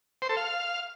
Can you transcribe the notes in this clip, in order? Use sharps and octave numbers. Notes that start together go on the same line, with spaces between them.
C5
A4
F5